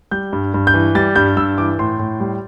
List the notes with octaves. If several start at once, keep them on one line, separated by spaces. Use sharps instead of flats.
G3 G6
G2
G2
G6
E3
G3 A6
G2 G6
G2 E6
E3 D6
A2 C6
A2
G3